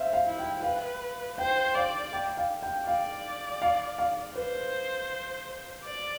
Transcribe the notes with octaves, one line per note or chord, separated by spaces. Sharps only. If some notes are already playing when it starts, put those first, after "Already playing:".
Already playing: C5 E5 F5
F5
E4
G5
B4 F5
C5 G5
D5 F5
G5
F5
G5
D5 F5
F5
F5
B4 C5
D5